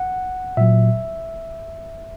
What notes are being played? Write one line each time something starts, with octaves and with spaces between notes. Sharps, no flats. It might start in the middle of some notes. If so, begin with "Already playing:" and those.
Already playing: F#5
A#2 F#3 E5